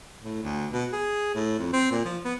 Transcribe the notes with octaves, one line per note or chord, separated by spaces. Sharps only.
A2
D2
B2
G#4
A2
F2
C4
A#2
F3
B3